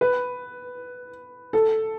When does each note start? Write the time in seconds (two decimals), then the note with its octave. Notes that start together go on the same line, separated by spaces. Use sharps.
0.01 B4
1.53 A4